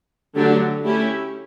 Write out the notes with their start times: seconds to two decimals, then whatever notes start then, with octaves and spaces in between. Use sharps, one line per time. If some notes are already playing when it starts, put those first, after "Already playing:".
0.36 D3 F#3 A3 D4 G4
0.84 A3 C#4 E4 G4